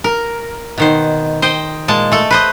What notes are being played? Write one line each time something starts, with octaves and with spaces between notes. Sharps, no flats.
A#4
B2 D#3 C5
C5 D#5 G5
A#2 G#3 A5
A3 A4
B4 C5 D#5